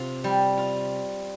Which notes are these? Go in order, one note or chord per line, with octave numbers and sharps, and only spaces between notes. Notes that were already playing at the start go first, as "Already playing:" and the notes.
Already playing: C3 F4
G3
F4